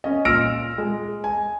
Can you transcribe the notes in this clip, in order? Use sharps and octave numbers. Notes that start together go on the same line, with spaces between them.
C#4 D#5
A#2 E6 F6 A#6 D7
G#3
G#5